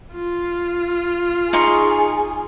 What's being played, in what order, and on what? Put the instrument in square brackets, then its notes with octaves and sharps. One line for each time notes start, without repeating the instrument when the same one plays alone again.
[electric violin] F4
[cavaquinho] D#4 C6 C#6 [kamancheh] G#4